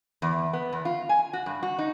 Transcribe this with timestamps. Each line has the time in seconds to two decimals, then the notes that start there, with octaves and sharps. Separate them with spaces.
0.22 E2
0.53 B3
0.73 E2
0.85 F4
1.09 G#5
1.33 F#4
1.46 G2
1.63 F#4
1.79 D#4